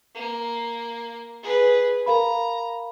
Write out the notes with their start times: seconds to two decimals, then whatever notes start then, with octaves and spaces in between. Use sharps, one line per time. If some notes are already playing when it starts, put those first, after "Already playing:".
0.15 A#3
1.43 G#4 B4
2.06 A#4 F5 A#5 B5